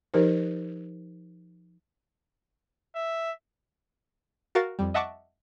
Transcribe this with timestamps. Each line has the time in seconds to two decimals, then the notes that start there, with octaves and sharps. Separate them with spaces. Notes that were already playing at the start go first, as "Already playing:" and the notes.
0.14 F3 D#4 G4 A#4 C5
2.95 E5
4.55 F#4 A#4 F5 A6
4.79 F2 G3
4.94 D#5 E5 F#5 A5 C#6 D6